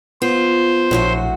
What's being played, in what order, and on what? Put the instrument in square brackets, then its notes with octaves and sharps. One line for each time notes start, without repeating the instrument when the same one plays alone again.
[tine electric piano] B3 [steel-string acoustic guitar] F4 [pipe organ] C5
[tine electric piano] A#1 [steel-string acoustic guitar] A2 F#3 F#4